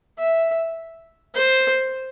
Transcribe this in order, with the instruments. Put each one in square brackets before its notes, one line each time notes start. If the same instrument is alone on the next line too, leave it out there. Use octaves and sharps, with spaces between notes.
[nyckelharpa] E5
C5